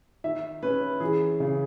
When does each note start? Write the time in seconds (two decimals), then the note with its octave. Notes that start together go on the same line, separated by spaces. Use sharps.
0.24 D#3 E5
0.63 C#4 B4
1.00 E3 G#4
1.40 C#3